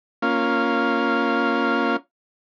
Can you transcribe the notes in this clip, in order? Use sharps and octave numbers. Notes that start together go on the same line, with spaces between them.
A#3 C#4 F4 F5